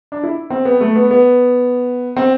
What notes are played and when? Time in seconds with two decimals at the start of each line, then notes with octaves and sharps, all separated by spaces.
0.12 D4
0.23 E4
0.50 C4
0.65 B3
0.80 A3
0.96 B3
1.11 B3
2.17 C4